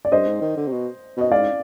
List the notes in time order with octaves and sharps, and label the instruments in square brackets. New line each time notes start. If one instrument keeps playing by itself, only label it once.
[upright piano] D5
[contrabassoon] G2 [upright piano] C5 D#5
[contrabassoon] G#2
D#3
D3
C3
B2
[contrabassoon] B2 [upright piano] D#5
[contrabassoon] G#2 [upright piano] D5 F5